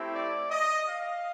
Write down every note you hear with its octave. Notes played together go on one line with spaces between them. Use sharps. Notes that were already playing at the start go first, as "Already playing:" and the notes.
Already playing: A3 C4 E4 G4
D5
D#5
F5